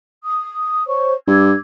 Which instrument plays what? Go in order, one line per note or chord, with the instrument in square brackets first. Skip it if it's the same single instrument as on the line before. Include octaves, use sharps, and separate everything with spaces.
[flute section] D#6
C5 C#5 C#6
[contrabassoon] G2 [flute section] D6 E6 G#6